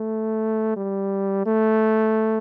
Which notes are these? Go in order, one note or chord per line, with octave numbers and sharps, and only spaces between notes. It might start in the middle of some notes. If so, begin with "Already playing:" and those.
Already playing: A3
G3
A3